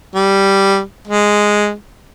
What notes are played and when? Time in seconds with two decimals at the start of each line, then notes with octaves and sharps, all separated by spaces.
0.15 G3
1.07 G#3